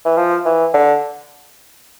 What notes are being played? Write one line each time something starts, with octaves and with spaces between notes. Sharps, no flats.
E3
F3
E3
D3